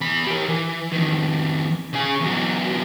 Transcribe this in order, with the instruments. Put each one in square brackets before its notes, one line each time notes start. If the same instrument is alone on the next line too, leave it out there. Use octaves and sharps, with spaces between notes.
[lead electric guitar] E2 B5
G4 A#4
E3
F2 D#3
C#3 G#4
E2 F#3